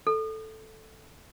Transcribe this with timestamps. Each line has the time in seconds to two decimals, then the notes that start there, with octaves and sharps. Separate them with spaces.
0.07 A4